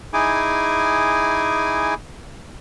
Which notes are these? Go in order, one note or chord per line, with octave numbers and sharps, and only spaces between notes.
D#4 E4 G#4 G#5 D6